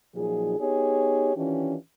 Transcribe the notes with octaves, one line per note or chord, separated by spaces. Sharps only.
A#2 F3 F#3 D#4 G#4
B3 D#4 G4 G#4 C#5
D#3 E3 C#4 D4 F4 G4